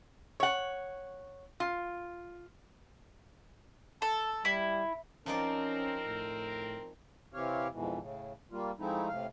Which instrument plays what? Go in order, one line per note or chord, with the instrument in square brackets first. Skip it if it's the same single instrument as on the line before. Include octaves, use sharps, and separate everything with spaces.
[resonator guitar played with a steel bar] C#5 F#5
F4
[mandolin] A4 [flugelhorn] A5
[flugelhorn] G3 [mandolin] E4
[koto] F3 D#4 D5 [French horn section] C4 A#4 [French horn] C#4
[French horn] A2
[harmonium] C3 E3 C4 G4 C#5 F5
F2 G#2 B2 E3
A2 C#3
G3 A#3 F4
F3 G#3 A3 C4 D#4 E4
A2 C3 F5